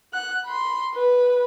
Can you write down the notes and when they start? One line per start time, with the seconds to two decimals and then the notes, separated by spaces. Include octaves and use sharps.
0.14 F#5 F#6
0.44 B5 C6
0.95 B4